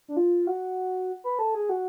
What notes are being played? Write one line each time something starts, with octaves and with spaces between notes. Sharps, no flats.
D4
F4
F#4
B4
A4
G#4
F#4